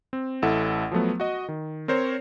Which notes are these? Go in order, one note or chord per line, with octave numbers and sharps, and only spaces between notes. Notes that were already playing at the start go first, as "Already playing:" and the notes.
C4
A1 E4 A4 F#5
F3 F#3 A3 B3
F#4 D#5
D#3
C4 A#4 C5 C#5